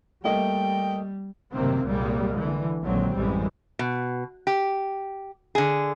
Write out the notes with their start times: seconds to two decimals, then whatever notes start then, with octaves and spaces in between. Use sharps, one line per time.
0.25 G3 A3 A#3 D#5 G5
1.53 F#1 A2 C3 D#3 A#3 C4
1.84 C2 F#2 A#2 G3 G#3 A#3
2.36 D3 E3
2.83 A#1 D#2 D3 F#3 G#3 C4
3.17 A1 F#2 E3 G3 G#3
3.79 B2
4.47 G4
5.55 D3 G#4